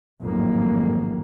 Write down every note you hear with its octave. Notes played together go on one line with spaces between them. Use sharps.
A1 F2 G#2 D#3 F#3 A#3